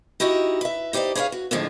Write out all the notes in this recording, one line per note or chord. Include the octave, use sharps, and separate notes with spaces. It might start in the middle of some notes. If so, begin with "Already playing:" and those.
D#4 E4 F#4 G4 D#5
B4 E5
D#4 G4 C5 D5 D#5
G#4 B4 C#5 D5 F5
F#4
F2 A2 D3 D#3 F3 G#3